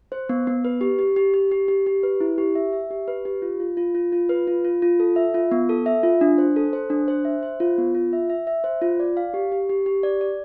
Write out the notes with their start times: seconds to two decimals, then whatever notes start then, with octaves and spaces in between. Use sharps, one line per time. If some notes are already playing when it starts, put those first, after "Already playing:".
0.12 C5
0.29 B3
0.47 B3
0.65 B4
0.81 G4
0.99 G4
1.16 G4
1.34 G4
1.52 G4
1.68 G4
1.86 G4
2.03 B4
2.21 E4
2.38 G4
2.55 E5
2.73 E5
2.91 G4
3.08 B4
3.25 G4
3.42 F4
3.60 F4
3.77 F4
3.95 F4
4.12 F4
4.29 B4
4.47 F4
4.65 F4
4.82 F4
5.00 A4
5.16 E5
5.34 F4
5.51 B3
5.69 A4
5.86 E5
6.03 F4
6.21 D4
6.38 C5
6.56 A4
6.73 C5
6.90 D4
7.08 C5
7.25 E5
7.43 C5
7.60 F4
7.78 B3
7.95 F4
8.13 E5
8.30 E5
8.47 E5
8.64 C5
8.82 F4
9.00 D5
9.17 F5
9.34 G4
9.52 G4
9.70 G4
9.86 G4
10.03 D5
10.21 D5